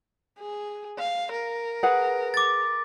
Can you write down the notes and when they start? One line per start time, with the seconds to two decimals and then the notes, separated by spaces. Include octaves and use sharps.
0.39 G#4
0.99 F5
1.33 A#4
1.83 G#4 B4 F#5
2.34 D6 A6